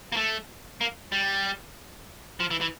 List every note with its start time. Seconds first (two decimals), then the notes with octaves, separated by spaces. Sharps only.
0.12 A#3
0.17 A3
0.81 A#3
1.12 G3
2.40 F3
2.51 E3
2.61 E3